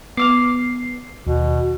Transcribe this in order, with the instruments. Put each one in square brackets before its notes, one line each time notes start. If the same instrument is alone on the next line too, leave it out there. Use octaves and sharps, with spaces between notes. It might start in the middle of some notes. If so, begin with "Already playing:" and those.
[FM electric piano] B3 C7 [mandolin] D6 E6 F6
[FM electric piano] D#2 [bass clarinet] B2